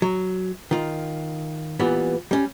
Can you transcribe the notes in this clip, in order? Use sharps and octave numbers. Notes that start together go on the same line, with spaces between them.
F#3
D#3 F4
A#2 E3 G3 B3
G3 C#4